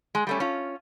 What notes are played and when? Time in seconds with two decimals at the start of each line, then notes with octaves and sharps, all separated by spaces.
0.15 G#3
0.27 G3 A3 C#4
0.40 C#4 F4